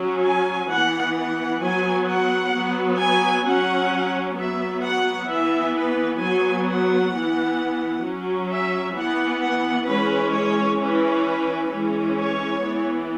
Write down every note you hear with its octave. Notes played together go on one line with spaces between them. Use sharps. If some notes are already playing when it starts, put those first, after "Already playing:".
Already playing: F#3 C#4
G#5
E3 B3 F#5
F#5
F#3 B3 G#5
F#5
F#3 B3
G#5
F#3 C#4 F#5
F#3 B3 E5
F#5
E3 B3 E5
B4
F#3 B3 G#5
F#5
E3 B3
F#3 C#4
E5
E3 B3 F#5
F#5
E3 G#3 C#4 B4
C#5
E3 C#4 B4
E3 G#3 C#4
C#5
E3 B3